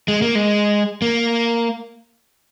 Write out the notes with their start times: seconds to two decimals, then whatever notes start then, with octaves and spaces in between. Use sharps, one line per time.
0.08 G#3
0.22 A#3
0.35 G#3
1.02 A#3